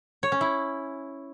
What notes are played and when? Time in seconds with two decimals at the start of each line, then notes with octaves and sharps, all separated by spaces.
0.23 C#5
0.32 C#4
0.41 E4